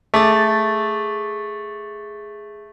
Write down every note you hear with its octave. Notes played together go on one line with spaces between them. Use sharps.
A3 G#4 D6 A6